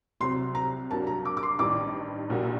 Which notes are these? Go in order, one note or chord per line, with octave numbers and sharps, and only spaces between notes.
C2 C3 F#3 C4 C6
A#5
G2 F#3 A#3 A5
A#5
D6
D6
C6
A1 G2 D#3 G3 D4 D6
A#1 A#2 G3 A#3 F#4